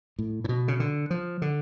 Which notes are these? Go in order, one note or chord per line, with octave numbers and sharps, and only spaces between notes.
A2
A2
B2
C#3
D3
F3
D3